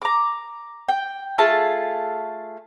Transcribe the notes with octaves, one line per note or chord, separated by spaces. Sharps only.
A#5 D6
G5
A3 F4 G#4 A5